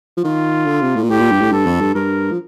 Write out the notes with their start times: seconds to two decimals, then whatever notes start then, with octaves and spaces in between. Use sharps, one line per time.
0.17 F3
0.24 D#3 F4
0.67 D3
0.81 C3
0.96 A2
1.03 A#2
1.09 A2 G4
1.20 A#2
1.31 G2
1.41 A2
1.52 G2 A4
1.66 F2
1.81 G2
1.94 G2 A#4
2.32 F3